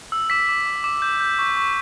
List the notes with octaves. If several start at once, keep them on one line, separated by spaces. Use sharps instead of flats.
E6
D6 B6
D6
D6
D6
G6
G6
C#6
C#6